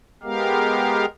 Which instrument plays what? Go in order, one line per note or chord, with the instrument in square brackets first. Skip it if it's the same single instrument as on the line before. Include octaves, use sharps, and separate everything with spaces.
[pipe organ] G#3 B3 G4 A#4 F5